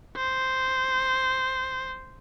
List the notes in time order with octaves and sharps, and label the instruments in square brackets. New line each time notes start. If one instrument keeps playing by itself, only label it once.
[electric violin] C5